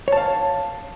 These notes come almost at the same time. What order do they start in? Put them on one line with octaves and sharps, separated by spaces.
C#5 A5 F5